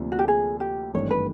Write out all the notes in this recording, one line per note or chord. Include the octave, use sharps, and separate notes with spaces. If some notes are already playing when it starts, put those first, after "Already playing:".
Already playing: D2 C3 F3 A#3 D4
F#4
G4
G#4
G4
G#1 G2 E3 A3 D4 C#5
B4